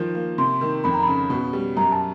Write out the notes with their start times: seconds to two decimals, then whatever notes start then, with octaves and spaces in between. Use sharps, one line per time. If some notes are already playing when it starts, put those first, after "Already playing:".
Already playing: D#3 F3
0.15 A#3
0.38 C3 C6
0.61 D#3
0.84 F2 B5
0.94 A#5
1.03 C#3 B5
1.30 B2
1.53 G3
1.77 F#2 A#5
1.92 A5